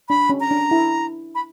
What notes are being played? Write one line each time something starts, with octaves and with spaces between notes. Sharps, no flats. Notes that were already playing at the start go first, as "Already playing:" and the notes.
D4 B5
C#4
A#5
D4
E4
B5